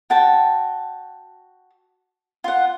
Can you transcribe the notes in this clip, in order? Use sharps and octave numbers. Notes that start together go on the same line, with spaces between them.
F#4 G5 A5
F4 F#5